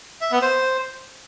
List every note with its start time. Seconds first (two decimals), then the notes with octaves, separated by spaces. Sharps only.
0.21 E5
0.32 B3
0.42 C5